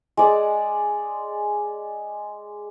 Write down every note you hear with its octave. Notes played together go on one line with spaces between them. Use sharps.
G#3 D5